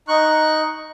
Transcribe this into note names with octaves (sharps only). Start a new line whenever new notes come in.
D#4 C#6 F#6